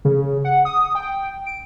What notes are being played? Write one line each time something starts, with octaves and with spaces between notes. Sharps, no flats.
C#3
F#5
D#6
G5
D7